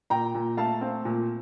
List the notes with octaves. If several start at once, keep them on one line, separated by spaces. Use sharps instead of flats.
A#2 G5 A#5
A#2
A3 F5 A5
C4
A#2